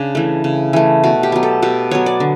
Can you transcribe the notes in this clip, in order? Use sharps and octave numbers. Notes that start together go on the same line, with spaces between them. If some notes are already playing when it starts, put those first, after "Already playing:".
Already playing: C#3 D4
E3 A3
C#3
E3 A3
B2 F#4
G4
F#3 B3
A4
B2 G4
F#3 B3 C#5
D5
D3